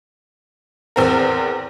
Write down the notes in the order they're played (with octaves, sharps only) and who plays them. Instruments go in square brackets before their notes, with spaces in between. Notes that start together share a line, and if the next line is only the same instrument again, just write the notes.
[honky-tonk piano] E2 C4 A#4